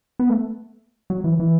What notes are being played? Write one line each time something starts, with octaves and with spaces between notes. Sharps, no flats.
B3
A3
F#3
E3
E3